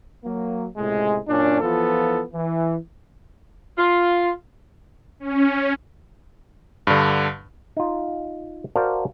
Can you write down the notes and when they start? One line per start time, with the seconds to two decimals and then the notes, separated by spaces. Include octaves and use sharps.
0.24 F#3 A#3
0.76 C#2 A2 C3 G#3
1.28 F#2 A#2 C#4 D4
1.61 E3 F3 B3 F4 A4
2.34 E3
3.78 F4
5.20 C#4
6.87 G2 D3
7.77 D#4 F4
8.76 F#4 A#4 C5 D5 F5 A5